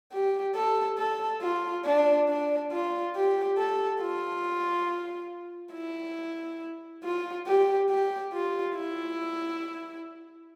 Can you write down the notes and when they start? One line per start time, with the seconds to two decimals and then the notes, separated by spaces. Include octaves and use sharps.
0.12 G4
0.55 A4
0.98 A4
1.42 F4
1.85 D4
2.28 D4
2.72 F4
3.15 G4
3.57 A4
4.01 F4
5.73 E4
7.04 F4
7.47 G4
7.90 G4
8.33 F4
8.76 E4